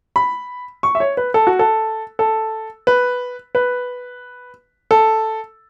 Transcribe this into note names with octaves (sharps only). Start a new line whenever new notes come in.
B5
C#6
E5
C#5
B4
A4
F#4
A4
A4
B4
B4
A4